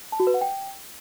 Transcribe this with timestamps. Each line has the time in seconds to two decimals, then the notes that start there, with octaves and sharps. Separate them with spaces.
0.12 A5
0.20 F#4
0.27 B4
0.34 F#5
0.41 G5